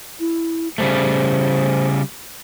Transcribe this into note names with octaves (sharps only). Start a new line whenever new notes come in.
E4
C#3 G3 A3 C5